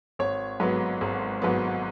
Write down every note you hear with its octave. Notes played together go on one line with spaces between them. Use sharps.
G#1 C#5
G#2 F#3 B3
G#1
G#2 F#3 B3